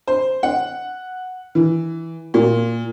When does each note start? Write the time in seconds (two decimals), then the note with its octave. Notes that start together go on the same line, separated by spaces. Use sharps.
0.07 C5
0.43 F#5
1.55 E3
2.34 A#2